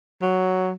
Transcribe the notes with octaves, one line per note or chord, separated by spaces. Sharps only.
F#3